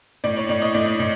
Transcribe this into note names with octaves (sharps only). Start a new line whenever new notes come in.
A2 D5
C#5
A2 D5
D#5
A2 D5
A2